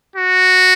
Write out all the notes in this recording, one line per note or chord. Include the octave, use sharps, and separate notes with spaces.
F#4